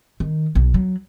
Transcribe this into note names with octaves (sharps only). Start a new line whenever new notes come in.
D#3
B1
F#3